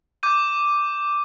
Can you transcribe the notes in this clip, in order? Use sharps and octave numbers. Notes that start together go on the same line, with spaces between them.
D6 G6 D#7